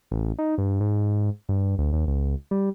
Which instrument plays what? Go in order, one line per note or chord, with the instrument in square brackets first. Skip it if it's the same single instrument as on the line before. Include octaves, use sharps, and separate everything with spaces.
[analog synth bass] A1
D#4
G2
G#2
G2
D2
D#2
C#2
G3